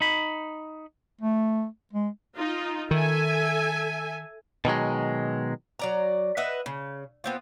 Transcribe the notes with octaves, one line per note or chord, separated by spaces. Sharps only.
D#4 B5
A3
G#3
D#4 F4
D#3 A4 E5 G#5
B2 D#3 F#3 G#3
F#3 D5 A#5
B4 D#5 E5 F#5
C#3
B3 C4 F4